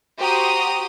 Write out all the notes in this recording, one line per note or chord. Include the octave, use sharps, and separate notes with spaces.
F#4 G4 C5 A#5 D#6